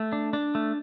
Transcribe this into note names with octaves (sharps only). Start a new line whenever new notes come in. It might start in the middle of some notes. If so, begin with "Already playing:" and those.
Already playing: A3
D4
D4
A3